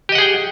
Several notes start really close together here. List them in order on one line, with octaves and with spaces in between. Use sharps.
G4 D#5 F#5 G#4 G5